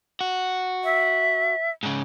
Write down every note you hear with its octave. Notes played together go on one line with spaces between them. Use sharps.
F#4
E5
G#2 C#3